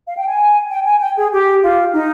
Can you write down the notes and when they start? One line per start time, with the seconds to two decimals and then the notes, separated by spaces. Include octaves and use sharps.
0.07 F5
0.17 G5
0.27 G#5
0.69 G5
0.84 G#5
1.00 G5
1.16 G#4
1.32 G4
1.62 F4
1.93 D#4